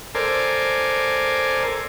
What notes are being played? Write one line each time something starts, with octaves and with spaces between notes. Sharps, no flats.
A4 A#4 C5 D5 G#5